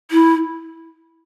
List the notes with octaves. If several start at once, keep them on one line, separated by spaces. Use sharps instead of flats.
E4